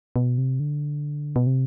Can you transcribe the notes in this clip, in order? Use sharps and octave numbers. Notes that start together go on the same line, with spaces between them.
B2
C3
D3
B2
C3